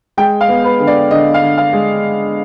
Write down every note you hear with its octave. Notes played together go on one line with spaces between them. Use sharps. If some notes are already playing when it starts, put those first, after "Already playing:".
G#3 G5
F5
B3
B4
D3
D5
D3 D#5
F5
D3
F5
G#3